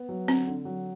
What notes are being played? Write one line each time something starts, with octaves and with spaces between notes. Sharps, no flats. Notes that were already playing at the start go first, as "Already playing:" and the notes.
Already playing: B3
F#3
D3 C4
D3
F#3